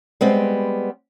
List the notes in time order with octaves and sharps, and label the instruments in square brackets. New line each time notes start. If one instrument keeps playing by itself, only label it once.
[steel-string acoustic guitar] G3 G#3 B3 C4